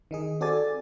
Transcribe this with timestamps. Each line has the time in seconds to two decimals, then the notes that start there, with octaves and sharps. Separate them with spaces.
0.11 D#3 D#4 G#4
0.41 C4 F#4 A4 D5 G#5 A6